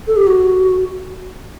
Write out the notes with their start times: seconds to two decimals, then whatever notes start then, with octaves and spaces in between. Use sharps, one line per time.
0.07 A4
0.17 G4
0.27 F#4